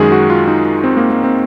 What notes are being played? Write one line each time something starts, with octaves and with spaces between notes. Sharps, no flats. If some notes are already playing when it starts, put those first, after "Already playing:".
Already playing: F#2 D#3 G#3 F#4 G#4
F#4
F4
D#4
C4
A#3
A#3
C4